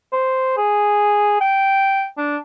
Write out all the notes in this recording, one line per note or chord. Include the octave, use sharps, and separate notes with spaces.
C5
G#4
G5
D4